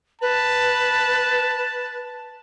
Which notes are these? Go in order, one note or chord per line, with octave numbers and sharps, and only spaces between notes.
B4 A5